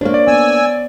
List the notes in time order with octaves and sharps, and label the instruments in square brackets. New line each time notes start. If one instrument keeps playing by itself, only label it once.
[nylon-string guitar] A#3 D4 [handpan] C5 C#5
[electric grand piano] D5
[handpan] B3 [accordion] G#5 E6